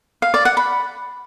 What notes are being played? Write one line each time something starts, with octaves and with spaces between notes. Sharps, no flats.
F5
D5
F#5
B5